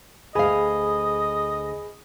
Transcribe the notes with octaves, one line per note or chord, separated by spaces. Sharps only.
D2 G#4 D#5 F5 G#5 B5